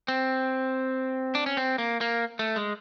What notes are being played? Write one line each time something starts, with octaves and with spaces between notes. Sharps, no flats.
C4
D4
C#4
C4
A#3
A#3
A3
G#3